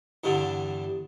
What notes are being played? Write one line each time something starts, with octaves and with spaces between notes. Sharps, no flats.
E2 G2 D3